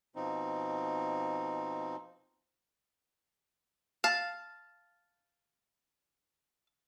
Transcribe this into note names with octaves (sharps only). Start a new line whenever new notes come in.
B2 F3 C4 D#4
F5 A5